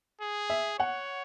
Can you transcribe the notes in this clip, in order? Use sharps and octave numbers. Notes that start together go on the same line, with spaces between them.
G#4
E5
C#5 F#5